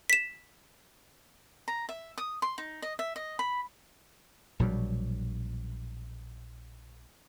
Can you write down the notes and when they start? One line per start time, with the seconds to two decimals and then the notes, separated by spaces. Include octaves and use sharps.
0.10 B6 E7
1.68 A#5
1.89 E5
2.18 D#6
2.42 C6
2.58 D#4
2.82 D#5
2.99 E5
3.16 D#5
3.39 B5
4.59 A#1 B2 F#3 G3